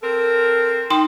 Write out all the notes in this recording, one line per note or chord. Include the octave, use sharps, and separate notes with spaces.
C4 A4 A#4
D#4 G5 C6